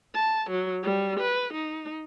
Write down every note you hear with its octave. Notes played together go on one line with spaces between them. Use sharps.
A5
F#3
G3
B4
D#4